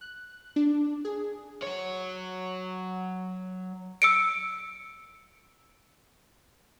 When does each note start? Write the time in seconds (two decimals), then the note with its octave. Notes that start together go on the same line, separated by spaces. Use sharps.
0.01 F#6
0.56 D4
1.05 G#4
1.63 F#3 C#5
4.02 E6 C#7 D7